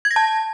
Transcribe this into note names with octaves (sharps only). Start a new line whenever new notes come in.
G#6
A#6
A5